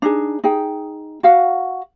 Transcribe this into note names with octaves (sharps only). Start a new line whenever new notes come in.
D4 D#4 G#4
D#4 G#4 G5
F#4 F5 F#5